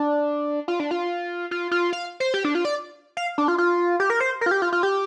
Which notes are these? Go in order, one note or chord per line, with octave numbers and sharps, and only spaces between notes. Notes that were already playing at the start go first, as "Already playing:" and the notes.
Already playing: D4
F4
D4
F4
F4
F4
F5
C5
G4
D4
F4
D5
F5
D4
F4
F4
G4
A#4
C5
A#4
F4
G4
F4
F4
G4